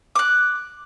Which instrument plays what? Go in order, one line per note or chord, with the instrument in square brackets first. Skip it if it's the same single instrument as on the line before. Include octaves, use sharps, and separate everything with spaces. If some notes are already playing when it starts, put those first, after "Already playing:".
[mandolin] D6 F#6